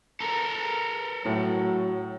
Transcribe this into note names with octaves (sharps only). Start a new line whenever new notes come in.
A4 A#4
A2 F#3